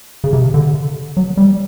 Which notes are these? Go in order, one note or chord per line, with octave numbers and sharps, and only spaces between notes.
C#3
C3
D3
F#3
G3